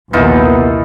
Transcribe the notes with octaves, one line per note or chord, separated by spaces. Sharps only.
A#1 D#2 C3 E3 B3 D#4 F4